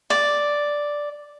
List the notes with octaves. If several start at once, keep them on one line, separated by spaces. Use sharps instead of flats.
D5